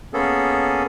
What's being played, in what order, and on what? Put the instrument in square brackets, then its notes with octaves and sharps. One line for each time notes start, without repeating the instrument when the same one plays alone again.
[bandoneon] A#3 B3 C#4 G#4 A4